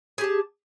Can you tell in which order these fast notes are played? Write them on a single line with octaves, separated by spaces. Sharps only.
G#4 G4 A5